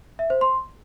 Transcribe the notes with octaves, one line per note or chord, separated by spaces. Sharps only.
E5
C5
C6